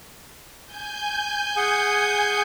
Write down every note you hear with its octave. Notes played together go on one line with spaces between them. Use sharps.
G#5 G6
G#4 F#5 D#6